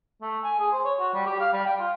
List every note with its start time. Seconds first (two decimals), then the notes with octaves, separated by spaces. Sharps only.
0.22 A3
0.43 G#5
0.59 G#4
0.72 C5
0.85 C#5
1.00 F#4
1.14 G3
1.26 G4
1.40 F5
1.53 G3
1.66 G5
1.79 F4